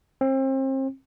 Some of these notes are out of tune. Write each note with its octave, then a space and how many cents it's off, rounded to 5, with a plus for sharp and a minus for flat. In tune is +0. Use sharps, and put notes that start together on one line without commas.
C4 +35